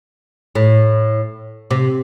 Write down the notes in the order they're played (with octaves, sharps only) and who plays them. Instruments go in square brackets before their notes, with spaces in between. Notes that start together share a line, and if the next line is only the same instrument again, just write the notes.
[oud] A2
C3